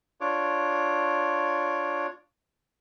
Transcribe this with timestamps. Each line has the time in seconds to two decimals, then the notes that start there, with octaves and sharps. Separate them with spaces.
0.21 D4 F4 C#5 D6